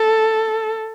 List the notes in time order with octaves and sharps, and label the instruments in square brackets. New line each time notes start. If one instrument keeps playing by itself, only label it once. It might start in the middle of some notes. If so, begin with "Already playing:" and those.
Already playing: [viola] A4